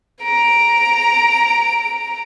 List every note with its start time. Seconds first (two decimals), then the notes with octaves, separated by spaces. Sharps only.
0.24 A#5 D7